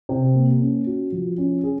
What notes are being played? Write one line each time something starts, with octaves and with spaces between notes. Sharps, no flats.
C3
A#3
C#4
F#4
F3
C#4
G#4